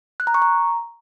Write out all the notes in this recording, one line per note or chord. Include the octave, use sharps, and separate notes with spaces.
F#6
A#5
C#6
A#5